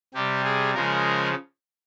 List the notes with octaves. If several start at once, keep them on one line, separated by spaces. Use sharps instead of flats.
C3 G3 G4
G#4
C#3 F3 G#3 A#4